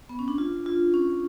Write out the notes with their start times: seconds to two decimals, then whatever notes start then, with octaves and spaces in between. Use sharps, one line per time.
0.09 B3
0.19 C#4
0.28 D4
0.38 F4
0.66 F4
0.94 C#4